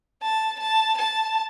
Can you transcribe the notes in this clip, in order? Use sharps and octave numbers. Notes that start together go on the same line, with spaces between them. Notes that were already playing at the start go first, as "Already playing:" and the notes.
A5
A5
A5